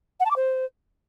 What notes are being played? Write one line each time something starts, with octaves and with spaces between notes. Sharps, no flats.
F#5
A5
D6
C5